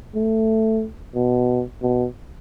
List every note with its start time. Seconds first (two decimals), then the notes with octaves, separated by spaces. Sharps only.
0.15 A3
1.15 B2
1.82 B2